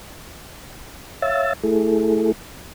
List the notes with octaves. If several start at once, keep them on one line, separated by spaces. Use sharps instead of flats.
C#5 E5 F5 E6 A6
A3 E4 G#4 A4